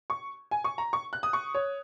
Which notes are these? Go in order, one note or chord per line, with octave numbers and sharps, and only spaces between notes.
C#6
G#5
C#6
A#5
C#6
F#6
D#6
C#6
C#5